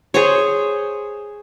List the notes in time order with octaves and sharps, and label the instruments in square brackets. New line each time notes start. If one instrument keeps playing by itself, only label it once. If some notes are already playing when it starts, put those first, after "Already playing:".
[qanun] G#4 C5 C#5